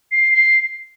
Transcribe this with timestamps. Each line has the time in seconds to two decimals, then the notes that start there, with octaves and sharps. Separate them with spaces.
0.12 C7
0.33 C7